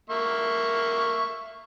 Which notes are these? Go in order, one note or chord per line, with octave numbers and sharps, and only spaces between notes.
A#3 E5 C#6